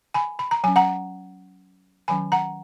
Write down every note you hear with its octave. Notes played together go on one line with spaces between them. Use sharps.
G#5 B5
B5
A#5
F#3 C#4 G#5
F#5 A#5
D#3 F#3 C#4 G#5 B5
F#5 A#5